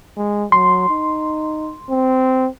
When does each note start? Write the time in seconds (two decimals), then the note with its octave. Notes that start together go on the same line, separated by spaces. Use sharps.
0.17 G#3
0.52 F#3 C6
0.89 D#4
1.90 C4